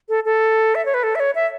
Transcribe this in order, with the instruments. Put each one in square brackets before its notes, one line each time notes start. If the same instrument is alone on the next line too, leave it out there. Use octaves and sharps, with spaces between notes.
[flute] A4
A4
E5
C#5
B4
A4
E5
C#5
E5